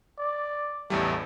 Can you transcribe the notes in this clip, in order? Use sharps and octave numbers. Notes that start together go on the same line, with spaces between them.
D5
A1 E2 G3 A3